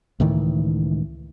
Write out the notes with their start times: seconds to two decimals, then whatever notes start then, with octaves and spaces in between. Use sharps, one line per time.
0.20 C#2 A2 D#3 E3